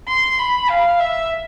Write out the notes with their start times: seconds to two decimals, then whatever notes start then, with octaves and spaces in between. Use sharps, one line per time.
0.08 C6
0.39 B5
0.70 F5
1.00 E5